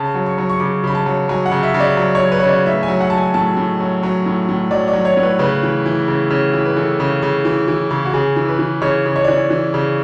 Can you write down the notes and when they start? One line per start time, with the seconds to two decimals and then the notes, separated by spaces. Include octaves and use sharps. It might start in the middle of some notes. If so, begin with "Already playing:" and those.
Already playing: C#3 A5
0.14 F#3
0.26 C#6
0.38 F#3
0.50 C#6
0.60 C#3 D6
0.84 C#3 B5
0.95 A5
1.06 F#3
1.29 F#3 G#5
1.46 F#5
1.51 C#3
1.63 E5
1.74 C#3
1.80 D5
1.97 F#3
2.15 F#3 C#5
2.32 B4
2.40 C#5
2.44 C#3
2.49 D5
2.66 A2 E5
2.83 G#5
2.88 F#3
3.00 F#5
3.10 F#3 A5
3.17 G#5
3.34 A2 A5
3.57 A2
3.80 F#3
4.03 F#3
4.26 A2
4.49 A2
4.71 F#3 D5
4.88 D5
4.93 F#3
5.05 C#5
5.17 A2
5.23 B4
5.39 C#3 B4
5.63 E3
5.86 E3
6.08 C#3
6.30 C#3
6.53 E3
6.65 B4
6.76 E3 A4
7.00 C#3
7.23 C#3
7.45 E3
7.68 E3
7.91 C#3
8.05 F#4
8.14 C#3 G#4
8.36 E3
8.49 B4
8.59 E3
8.82 C#3 C#5
9.06 C#3
9.16 C#5
9.24 D5
9.28 E3 C#5
9.50 E3
9.74 C#3